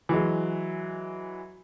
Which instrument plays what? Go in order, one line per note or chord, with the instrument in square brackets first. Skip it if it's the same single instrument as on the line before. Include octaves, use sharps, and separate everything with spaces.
[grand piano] E3 F#3 G#3